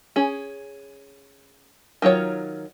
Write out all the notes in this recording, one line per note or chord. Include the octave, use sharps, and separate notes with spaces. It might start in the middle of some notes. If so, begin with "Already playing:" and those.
C#4 G#4
D#3 F#3 F4 C#5